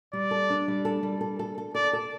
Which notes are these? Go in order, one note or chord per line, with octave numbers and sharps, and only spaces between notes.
G3 D5
A4
D4
G3
A4
G3
A4
A4
A4
A4 D5
A4